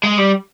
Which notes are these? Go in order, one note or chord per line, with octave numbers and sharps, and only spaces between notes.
G#3
G3